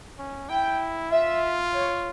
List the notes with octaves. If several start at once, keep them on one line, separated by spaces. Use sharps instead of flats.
C#4
E4 G5
F4 E5
C#5